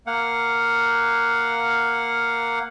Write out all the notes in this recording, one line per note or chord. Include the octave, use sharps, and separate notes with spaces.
A#3 F5 F#5